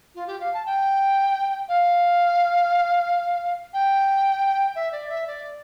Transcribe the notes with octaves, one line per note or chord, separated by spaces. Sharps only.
F4
G4
F5
A5
G5
F5
G5
E5
D5
E5
D5